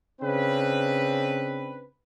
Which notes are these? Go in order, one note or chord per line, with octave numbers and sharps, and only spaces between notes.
C#3 C4 D4 B4